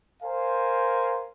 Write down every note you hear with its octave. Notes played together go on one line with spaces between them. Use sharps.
A#4 C5 F5 G#5